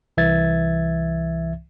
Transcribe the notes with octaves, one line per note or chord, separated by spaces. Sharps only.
C2 E3 E5 G#6 A6